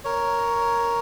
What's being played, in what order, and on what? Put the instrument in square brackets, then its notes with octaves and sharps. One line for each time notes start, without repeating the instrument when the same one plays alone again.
[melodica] A#4 C#5